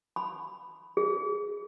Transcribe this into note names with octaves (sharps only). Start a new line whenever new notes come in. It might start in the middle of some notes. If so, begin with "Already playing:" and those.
B5
G#4